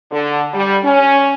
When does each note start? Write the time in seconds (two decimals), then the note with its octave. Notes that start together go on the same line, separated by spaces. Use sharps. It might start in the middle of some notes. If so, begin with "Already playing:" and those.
0.11 D3
0.53 G3
0.84 C#4